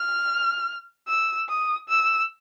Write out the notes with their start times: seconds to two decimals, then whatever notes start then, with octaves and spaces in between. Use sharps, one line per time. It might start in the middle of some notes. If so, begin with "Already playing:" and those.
Already playing: F6
1.08 E6
1.49 D#6
1.89 E6